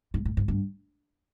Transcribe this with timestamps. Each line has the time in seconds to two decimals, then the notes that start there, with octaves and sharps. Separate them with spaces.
0.14 G#2
0.25 A2
0.37 G#2
0.48 G2